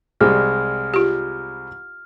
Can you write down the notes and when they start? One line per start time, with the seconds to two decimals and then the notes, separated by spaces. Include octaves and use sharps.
0.21 C2 G3 G#3 F6
0.94 F4 G4